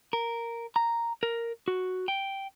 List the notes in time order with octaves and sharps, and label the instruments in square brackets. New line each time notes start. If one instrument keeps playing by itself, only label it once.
[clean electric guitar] A#4
A#5
A#4
F#4
G5